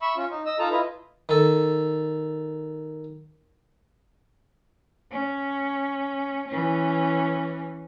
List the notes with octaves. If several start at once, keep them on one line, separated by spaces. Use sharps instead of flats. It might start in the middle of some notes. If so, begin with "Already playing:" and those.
E5 B5 C#6 E6
C#4 F4
D#4
D#5 E6
D#4 F4 A4 A5 A#5
E4 F4 B4 D#5
D#3 A4
C#4
E3 C#4